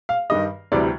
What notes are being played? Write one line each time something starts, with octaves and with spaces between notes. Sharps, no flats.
F5
G2 D#3 G3 D#5
D2 C3 E3 G3 D5